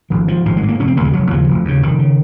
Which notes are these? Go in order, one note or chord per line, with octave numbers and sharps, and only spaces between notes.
G#1 F3
G#2 F3
G#1 F3
G#3
G#2
A#3
F1 C#4
C4
D#2 C#3 G#3 A#3
F1 F#3
D#2 C#3 F3
F1
D#2 C#3
F1 D#3
C#3